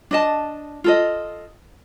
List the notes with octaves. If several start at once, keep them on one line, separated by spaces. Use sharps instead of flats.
D4 D#5 A5
F4 A4 D#5